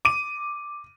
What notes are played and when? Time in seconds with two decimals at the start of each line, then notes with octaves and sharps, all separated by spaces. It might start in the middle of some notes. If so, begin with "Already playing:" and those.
0.05 D6 D#7